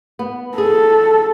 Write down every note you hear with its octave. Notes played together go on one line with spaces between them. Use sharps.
B3
G#4 A4